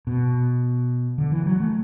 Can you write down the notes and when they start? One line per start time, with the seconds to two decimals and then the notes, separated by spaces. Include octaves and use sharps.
0.07 B2
1.18 D3
1.32 E3
1.46 F#3
1.60 A3